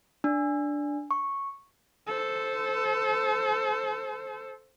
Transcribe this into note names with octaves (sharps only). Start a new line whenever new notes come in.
D4
C#6
A4 C5